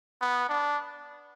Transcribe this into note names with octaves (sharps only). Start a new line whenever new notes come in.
B3
D4